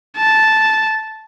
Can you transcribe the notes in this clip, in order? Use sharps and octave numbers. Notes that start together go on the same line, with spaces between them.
A5